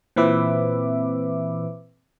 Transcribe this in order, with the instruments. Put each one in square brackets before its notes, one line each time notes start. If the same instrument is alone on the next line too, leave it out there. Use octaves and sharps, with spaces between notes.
[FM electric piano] A#2 E3 C4 B4 E5 D6